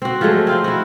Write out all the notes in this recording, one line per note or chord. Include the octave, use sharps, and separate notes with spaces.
C4 F#4
F3 F#3 G#3 A3
C4 F4 C5
E4 F#4